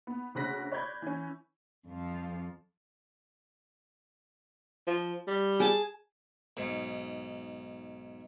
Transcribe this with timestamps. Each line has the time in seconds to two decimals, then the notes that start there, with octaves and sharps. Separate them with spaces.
0.07 B3
0.35 D2 C#3 C5 F#6 A#6 B6
0.72 C#5 D5 B5 G6 G#6
1.02 E3 C#4
1.88 F2 F3
4.87 F3
5.28 G3
5.60 G#4 A5
6.57 B1 G#2